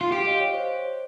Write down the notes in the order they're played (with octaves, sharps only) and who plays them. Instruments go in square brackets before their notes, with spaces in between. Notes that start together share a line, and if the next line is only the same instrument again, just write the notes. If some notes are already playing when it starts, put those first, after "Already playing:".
[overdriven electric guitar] F4
[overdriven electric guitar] G4 [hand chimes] F5
[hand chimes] D#5
C#5
C5